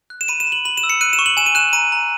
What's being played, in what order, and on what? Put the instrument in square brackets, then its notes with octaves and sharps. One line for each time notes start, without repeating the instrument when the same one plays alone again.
[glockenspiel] F#6
E7
B5 D#7
E7
B5
F#7
B5 F#7
E7
E6
C#7
F#6 D#7
E7
C#6
F#7
G#5 E7
D#7
F#6 E7
A#5 D#7
A#5